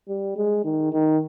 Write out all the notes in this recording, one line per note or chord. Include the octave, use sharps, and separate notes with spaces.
G3
G#3
D#3
D#3